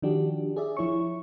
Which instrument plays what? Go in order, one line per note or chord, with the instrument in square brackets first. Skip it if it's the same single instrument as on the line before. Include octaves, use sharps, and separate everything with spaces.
[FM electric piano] D#3 F3 D4 F#4 G4
G#4 D5 E5
F3 E4 C#5 C#6